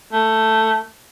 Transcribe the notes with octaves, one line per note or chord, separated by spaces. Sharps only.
A3